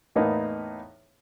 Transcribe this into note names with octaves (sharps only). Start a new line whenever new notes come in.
E2 A2 A#3 B3 D#4